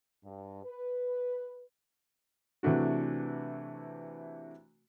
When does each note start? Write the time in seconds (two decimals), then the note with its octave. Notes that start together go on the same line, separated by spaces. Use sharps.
0.24 G2
0.64 B4
2.63 C3 E3 A3 D4 F#4